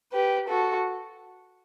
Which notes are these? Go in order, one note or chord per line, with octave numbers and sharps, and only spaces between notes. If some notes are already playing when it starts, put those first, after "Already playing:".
G4 B4
F#4 A4